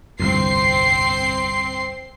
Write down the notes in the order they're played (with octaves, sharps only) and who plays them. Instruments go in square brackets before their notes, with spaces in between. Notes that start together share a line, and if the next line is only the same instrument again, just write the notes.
[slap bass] G1 C2 F2 [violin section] C4 C6 C7